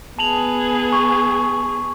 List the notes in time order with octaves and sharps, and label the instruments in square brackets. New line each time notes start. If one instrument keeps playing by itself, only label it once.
[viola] B3 G#4 [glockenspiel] A5 F7 F#7
[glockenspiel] C#6